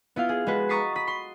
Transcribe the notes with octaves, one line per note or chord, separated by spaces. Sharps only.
B3 E4 F4 F5
G#4
G#3 B3 F#4 B4
A#5 C#6 D#6 A6 B6 C7
B5 D#6 B6
C6